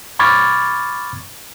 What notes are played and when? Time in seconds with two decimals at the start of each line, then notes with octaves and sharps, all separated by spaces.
0.19 B5 C#6 D6 F6 G#6 A6